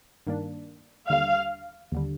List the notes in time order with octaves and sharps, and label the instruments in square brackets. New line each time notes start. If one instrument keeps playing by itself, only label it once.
[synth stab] G2 D#3 A#3 D4
[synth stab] D#2 D3 G3 [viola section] F5
[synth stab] D#2 D3 G3